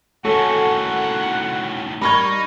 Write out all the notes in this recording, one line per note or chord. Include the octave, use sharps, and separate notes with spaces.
A2 D#3 C#4 F#4 A4 F#5
G3 D#4 A#4 B5 C#6 G#6